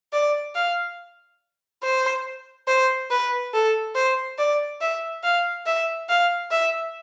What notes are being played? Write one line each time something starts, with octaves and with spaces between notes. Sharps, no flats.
D5
F5
C5
C5
B4
A4
C5
D5
E5
F5
E5
F5
E5